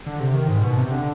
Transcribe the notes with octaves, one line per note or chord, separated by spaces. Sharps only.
D3
C3
D#3
G#2
B2
C3
D3